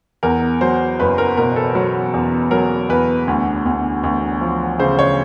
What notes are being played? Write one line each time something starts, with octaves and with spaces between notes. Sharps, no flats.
E2 A#4
F#3 C5
F#1 B4
A#4
B2 A#4
A4
F#3
E2
F#3 A#4
E2 B4
D2
D2
D2
F3
C#3 C5
C#5